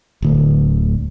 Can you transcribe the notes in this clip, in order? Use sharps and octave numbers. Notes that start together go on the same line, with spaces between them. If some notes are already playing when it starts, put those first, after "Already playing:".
D1 D2